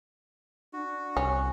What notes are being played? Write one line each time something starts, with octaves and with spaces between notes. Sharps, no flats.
D4 F#4
C2 C#4